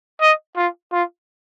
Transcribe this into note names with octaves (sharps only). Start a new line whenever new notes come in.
D#5
F4
F4